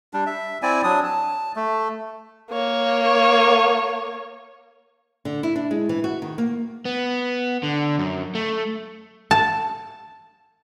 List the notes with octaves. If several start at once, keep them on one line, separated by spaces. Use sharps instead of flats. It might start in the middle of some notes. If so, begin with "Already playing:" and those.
G3 D4
E5
C4 E4 D5 G#5
F#3 D4 D#6
A5
A3
A#3 C#5
D3
E4
D4
G#3
E3
F#4
D#3
A#3
B3
D3
F#2
A3
A5